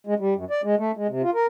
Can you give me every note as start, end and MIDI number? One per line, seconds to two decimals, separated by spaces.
0.07 0.14 56
0.19 0.34 55
0.35 0.45 42
0.50 0.61 74
0.64 0.75 56
0.78 0.91 57
0.97 1.07 56
1.09 1.22 48
1.22 1.30 65
1.34 1.46 70